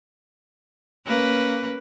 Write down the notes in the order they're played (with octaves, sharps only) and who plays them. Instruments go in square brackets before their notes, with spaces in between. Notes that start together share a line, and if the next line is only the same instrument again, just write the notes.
[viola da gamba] A#3 C#4 B4